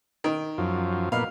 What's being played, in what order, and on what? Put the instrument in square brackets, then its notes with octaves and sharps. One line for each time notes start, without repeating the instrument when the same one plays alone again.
[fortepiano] D#3
[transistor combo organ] F#2 F3
[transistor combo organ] A#2 B3 [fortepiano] F5